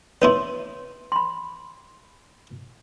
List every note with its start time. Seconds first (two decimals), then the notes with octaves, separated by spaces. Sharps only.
0.22 B3 D#4 E4 C#5 C6
1.12 B5 C6